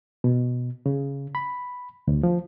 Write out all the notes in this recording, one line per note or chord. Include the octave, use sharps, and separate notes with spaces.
B2
C#3
B5
D2
F3